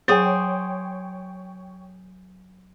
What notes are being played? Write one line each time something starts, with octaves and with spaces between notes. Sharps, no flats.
F#3 G#4 C5 C#5 G5